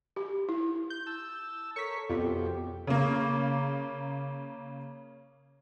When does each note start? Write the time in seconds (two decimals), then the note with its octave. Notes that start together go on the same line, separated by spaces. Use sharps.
0.16 G4
0.49 E4
0.90 G6
1.07 A5 E6
1.76 A4 A#4 C#5 C#6 B6
2.10 F2 B2 F3 G4
2.87 C#3 A#3